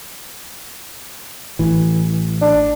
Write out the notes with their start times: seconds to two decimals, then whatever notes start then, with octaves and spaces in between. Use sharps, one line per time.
1.59 A1 E3
2.41 D4